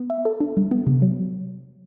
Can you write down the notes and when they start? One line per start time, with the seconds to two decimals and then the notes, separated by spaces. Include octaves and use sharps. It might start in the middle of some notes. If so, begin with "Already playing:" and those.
Already playing: B3
0.10 E5
0.25 A4
0.40 D4
0.57 G3
0.71 B3
0.87 C3
1.02 F#3